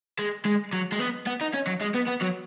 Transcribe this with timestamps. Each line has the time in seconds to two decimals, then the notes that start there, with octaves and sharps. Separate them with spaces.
0.19 G#3
0.45 G#3
0.73 F#3
0.92 G#3
0.99 B3
1.27 B3
1.41 D#4
1.54 C#4
1.67 F#3
1.81 G#3
1.95 B3
2.08 B3
2.22 F#3